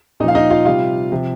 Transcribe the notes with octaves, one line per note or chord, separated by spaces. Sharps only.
A#2 F3 D#4 D#5 F5
D#4 D#5
F4 F5
C3 G3 F4 F5
C3 F3